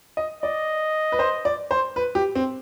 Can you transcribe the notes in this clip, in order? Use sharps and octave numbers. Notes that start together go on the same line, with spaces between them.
D#5
D5 D#5
B4
C5
D5
C5
B4
G4
C4